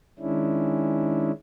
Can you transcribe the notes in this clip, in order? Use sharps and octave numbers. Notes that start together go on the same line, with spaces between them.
D#3 G#3 C#4 D4 E4